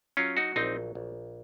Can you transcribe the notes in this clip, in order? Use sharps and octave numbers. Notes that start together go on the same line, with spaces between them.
F#3 C#4 F4
D#4 F#4
A#1 C4 D#4
A#1